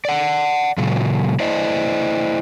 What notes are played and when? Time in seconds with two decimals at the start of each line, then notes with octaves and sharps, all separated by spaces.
0.05 D5 F#5
0.78 A#2 C#3 F#3
1.40 E4 C5 D5 D#5